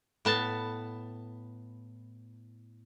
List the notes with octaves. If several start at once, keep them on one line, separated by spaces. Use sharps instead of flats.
A2 B3 A5